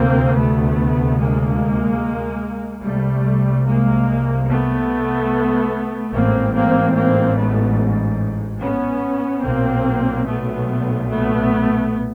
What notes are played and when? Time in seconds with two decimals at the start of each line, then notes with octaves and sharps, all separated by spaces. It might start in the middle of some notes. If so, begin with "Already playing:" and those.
Already playing: D2 C3 A#3 C4
0.35 A3 B3
1.18 G#3 A#3
2.83 C2 C3 G3 A3
3.66 G#3 A#3
4.47 A3 B3
6.13 A1 G#2 A#3 C4
6.55 A#3 C4
6.96 A#3 C4
7.36 A3 B3
8.61 B3 C#4
9.43 B1 A#2 A#3 C4
10.26 A3 B3
11.09 A3 B3